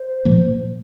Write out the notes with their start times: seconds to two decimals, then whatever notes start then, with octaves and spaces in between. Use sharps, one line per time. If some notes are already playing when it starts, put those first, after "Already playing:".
Already playing: C5
0.25 A#2 F3 A#3